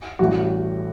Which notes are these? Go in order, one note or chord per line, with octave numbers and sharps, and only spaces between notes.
A1 A2 E3 G3 F#4